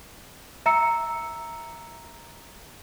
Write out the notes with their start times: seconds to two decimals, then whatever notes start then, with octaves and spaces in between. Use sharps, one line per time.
0.66 E5 A#5 E6 C#7